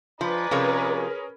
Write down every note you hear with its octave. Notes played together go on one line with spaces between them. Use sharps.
F3 G#3 B4 D5 A#5
C3 F3 C#4 G#4 A#4 C#5